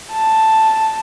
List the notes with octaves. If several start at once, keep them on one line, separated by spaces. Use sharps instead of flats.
A5